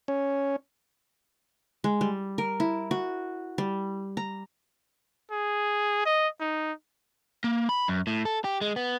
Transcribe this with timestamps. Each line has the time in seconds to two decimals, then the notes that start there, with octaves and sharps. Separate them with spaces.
0.08 C#4
1.84 G#3
2.01 G3
2.38 A#4
2.60 E4
2.91 F#4
3.58 G3
4.17 A#5
5.31 G#4
6.06 D#5
6.41 D#4
7.44 A#3
7.69 B5
7.88 F#2
8.07 A2
8.25 A4
8.44 G4
8.61 G#3
8.76 B3